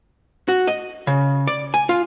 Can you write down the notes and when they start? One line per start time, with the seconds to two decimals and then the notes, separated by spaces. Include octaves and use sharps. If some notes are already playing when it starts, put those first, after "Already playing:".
0.48 F#4
0.67 D#5
1.07 C#3
1.47 D5
1.74 G#5
1.89 F4